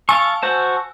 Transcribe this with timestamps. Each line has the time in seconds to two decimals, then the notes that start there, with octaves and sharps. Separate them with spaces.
0.09 F5 G#5 A5 C#6 E6
0.43 F#4 C5 A5